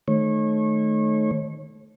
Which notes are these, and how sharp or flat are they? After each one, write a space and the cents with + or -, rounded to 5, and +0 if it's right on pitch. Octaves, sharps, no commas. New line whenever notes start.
D#3 -15 A3 -20 C#5 -30